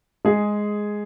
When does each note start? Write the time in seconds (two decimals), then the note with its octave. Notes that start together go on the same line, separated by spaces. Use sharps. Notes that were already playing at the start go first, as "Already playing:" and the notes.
0.25 G#3 G#4